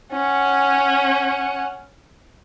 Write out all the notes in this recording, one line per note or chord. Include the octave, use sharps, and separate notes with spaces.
C#4 F#5